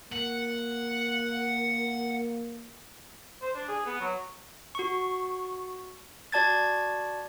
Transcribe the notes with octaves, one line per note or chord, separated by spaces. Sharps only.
A#3 F#5
C5
D4
G#4
B3
F#3
F#4 C#6
F#4 D5 A5 G#6 A6